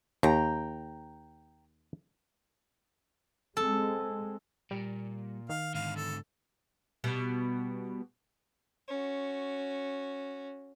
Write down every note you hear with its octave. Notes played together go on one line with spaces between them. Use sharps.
D#2 G5 A#5
G#3 C4 A4
A#2 G3
D#3 F5
G#2 D3 F5
A4
B2 G3 B3
C#4 F#4